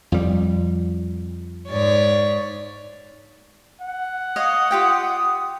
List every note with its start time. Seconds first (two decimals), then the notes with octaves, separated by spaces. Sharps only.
0.12 F2 G3
1.69 G#2 C#5 D5
3.81 F#5
4.36 C#5 D#5 F5 D#6
4.71 F4 G4 G5